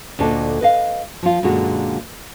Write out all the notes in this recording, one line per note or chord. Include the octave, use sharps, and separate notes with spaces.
D2 A#2 D4 A4 D#5
B4 D#5 F5
F3 F4
F#2 A#2 D3 G#3 F#4